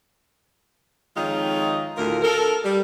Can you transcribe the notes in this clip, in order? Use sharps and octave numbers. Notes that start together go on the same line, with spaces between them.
F2 D#3 G#3 D#4 F4 C#5
D2 A2 F4 A#4
A4 A#4
G3